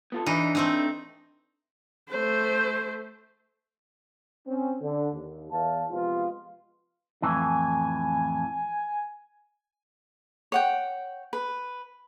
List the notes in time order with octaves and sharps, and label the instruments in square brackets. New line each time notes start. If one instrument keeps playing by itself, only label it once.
[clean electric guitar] B3 F4 A4
[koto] E3 D#4 [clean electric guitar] D4 B4 D#5
[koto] A3 C4 D#4
[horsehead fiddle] A3 C5
[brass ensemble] C4 C#4
D3
D#2
E2 F5 A5
C3 F3 G#3 B3 F4
[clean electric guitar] F2 A2 E3 [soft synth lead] G#5
[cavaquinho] C#5 F#5 G5
B4